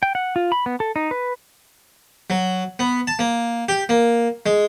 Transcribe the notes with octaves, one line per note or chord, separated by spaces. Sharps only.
G5
F#5
F4
B5
B3
A4
D#4
B4
F#3
B3
A5
A#3
G4
A#3
G#3